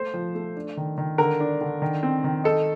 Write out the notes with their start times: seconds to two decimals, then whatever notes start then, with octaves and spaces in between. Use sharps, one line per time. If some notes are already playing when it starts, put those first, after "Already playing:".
Already playing: A3 C5
0.14 F3
0.35 A3
0.56 D4
0.77 D#3
0.98 D#3
1.18 D3 A#4
1.40 D4
1.61 D3
1.82 D#3
2.03 C4
2.24 D#3
2.44 D#4 A4